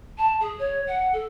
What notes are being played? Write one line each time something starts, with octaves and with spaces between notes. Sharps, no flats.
A5
G#4
C#5
F#5
A4